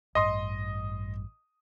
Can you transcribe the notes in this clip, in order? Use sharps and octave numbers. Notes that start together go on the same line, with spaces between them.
A1 G2 D#5 C6 D#6